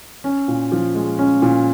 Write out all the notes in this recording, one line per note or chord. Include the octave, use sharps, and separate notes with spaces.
C#4
A#2
F3
G#3
C#4
A#2